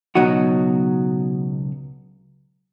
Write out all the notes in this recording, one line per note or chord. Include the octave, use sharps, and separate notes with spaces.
C#2 B2 F#3 D#4 F#4